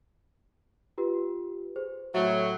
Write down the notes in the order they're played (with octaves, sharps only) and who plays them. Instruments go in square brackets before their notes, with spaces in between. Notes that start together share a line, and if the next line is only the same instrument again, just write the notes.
[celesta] F4 G4 B4
G#4 C5
[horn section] A2 F#3 [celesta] E5